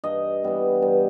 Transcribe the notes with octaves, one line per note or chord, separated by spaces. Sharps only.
G2 D#5
E3 G3 B3
G2